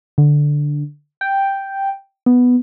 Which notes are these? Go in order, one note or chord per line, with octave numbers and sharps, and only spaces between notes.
D3
G5
B3